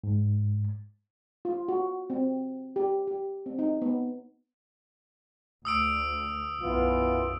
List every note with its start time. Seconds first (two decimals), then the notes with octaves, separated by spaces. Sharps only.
0.04 G#2
1.45 F4
1.68 F#4
2.10 C4
2.76 G4
3.07 G4
3.46 C4
3.59 D#4
3.82 B3
5.65 D2 D#6 E6 D7
6.62 B1 F#2 E3 B3 F4